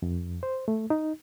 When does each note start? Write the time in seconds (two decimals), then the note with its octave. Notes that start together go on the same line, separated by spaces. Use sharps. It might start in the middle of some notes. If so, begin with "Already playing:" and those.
0.02 F2
0.43 C5
0.68 A3
0.90 D#4